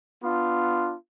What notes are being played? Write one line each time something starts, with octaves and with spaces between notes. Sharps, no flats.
B3 D4 F4